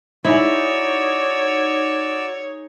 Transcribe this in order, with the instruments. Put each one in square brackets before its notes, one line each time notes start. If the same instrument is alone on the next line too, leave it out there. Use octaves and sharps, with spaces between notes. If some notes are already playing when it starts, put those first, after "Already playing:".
[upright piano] D#4 G#4 [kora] E4 [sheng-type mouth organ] F#4 D5 E6 [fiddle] C#5